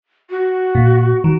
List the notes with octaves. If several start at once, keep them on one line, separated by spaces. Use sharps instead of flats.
F#4
A#2
D#3